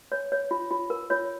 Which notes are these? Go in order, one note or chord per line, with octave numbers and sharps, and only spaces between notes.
C#5
C#5
F4
F4
A#4
F4 C#5